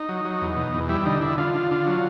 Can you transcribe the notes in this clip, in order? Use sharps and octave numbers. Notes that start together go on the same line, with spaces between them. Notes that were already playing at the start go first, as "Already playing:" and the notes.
Already playing: D#4
F#3
F#3
E2
B2
E2
G3 E4
D3 D#4
D3 E4
D3 F4
D3
D3
F#3